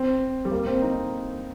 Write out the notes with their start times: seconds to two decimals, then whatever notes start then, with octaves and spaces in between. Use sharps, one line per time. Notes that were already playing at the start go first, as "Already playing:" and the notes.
Already playing: C4
0.45 G3
0.51 A#3
0.66 C4
0.82 D#4